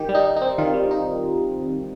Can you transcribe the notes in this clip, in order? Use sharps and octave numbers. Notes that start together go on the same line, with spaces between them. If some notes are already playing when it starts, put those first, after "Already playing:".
Already playing: D#3 G4
G3
D#4
D#4
D#4
C4
D#3 F4
G3
D#4